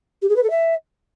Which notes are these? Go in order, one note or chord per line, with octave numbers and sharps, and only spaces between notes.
G4
G#4
B4
A4
E5